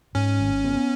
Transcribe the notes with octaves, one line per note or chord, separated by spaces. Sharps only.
G#2 C#4
G#1
B3